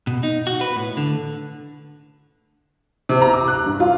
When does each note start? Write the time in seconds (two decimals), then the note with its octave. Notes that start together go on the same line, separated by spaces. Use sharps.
0.07 B2
0.23 D#4
0.47 F#4
0.61 B4
0.76 A2
0.97 D3
3.09 C3
3.22 A#5
3.34 D6
3.48 F#6
3.66 G2
3.80 F4